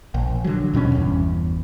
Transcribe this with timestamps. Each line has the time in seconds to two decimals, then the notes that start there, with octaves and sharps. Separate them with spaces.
0.14 A#1
0.44 D3 F#3
0.73 D#2 B2 G3 C#4
0.95 G1 E2